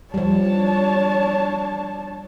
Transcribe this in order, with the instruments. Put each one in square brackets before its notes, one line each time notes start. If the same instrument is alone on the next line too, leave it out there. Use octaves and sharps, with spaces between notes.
[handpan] F3 G3 [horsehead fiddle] D4 A5 [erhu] C#5